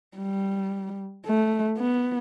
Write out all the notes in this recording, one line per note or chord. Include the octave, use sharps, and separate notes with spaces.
G3
A3
B3